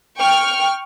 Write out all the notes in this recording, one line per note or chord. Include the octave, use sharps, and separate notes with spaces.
G5 C#6 F6